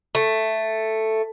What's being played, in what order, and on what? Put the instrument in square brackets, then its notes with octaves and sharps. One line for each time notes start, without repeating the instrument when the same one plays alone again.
[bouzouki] A3